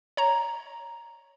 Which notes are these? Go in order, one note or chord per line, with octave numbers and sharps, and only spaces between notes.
C#5 A#5